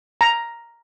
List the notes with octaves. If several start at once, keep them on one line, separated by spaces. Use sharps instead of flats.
A#5